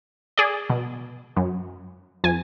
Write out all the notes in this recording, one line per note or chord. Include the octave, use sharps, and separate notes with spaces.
G#4 D5
B2
F#2
F2 G#5